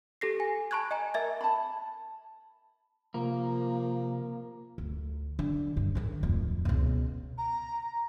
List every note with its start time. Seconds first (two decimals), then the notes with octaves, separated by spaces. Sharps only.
0.21 G4 A4 A#6 C7
0.40 G#5
0.71 A5 B5 C#6 F#6 G#6
0.91 D#5 G#5 A#5
1.14 A#4 E5 G#6
1.41 A5 B5
3.14 C3 F3 A#3
4.78 D2
5.39 D3
5.77 G2
5.95 G#2 D#3
6.23 D1 F2
6.65 C#2 B2
7.38 A#5